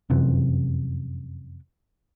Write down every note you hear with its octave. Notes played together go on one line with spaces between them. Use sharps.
F1 F#2 C3 E3